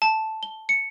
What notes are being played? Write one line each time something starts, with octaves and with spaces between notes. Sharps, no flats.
A5
G7
C#7